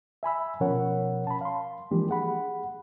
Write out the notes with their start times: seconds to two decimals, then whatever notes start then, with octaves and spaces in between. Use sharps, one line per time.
0.23 E5 G#5 B5 E6
0.60 B2 F3 C#4 A#4 C#5 F#5
1.27 A5 B5
1.41 F5 C6
1.91 E3 F3 G#3 A#3 D4 G4
2.09 G#4 F#5 B5